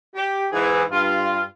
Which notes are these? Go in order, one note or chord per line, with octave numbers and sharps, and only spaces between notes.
G4
G#2 E3 G#4
G2 F4